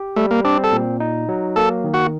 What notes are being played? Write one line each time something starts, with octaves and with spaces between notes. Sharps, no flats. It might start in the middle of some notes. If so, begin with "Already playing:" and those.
Already playing: G4
G3 A3
A#3
C4 D4
A4
A#2
D#4
F#3
A#3 A4
D#3
F#4